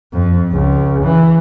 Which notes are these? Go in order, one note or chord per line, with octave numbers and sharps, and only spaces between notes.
F2
C#2
E3